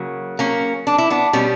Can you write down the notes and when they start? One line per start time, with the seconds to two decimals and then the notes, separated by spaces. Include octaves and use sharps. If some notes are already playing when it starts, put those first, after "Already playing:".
Already playing: C#3 F#3 A#3
0.39 A#3 C#4
0.87 D4
0.98 E4
1.10 B3 D4
1.33 B2 G3 A#3 C#4